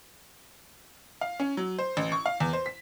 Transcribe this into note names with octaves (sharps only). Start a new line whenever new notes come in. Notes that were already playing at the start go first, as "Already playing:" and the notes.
F5
C#4
F#3
C5
A1
C#6
F5
E2
C5
B6